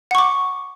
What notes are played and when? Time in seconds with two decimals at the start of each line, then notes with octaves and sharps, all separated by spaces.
0.11 F#5
0.15 C#6
0.18 D6